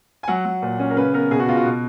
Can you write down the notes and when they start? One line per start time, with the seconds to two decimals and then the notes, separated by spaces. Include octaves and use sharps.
0.23 G#5
0.28 F#3 F#5
0.45 F#3
0.62 A#2
0.79 C#4
0.90 A#4
0.97 C#3 B4
1.14 B3 A#4
1.31 B2 G#4
1.40 F#4
1.48 B2 F4
1.57 F#4
1.66 B2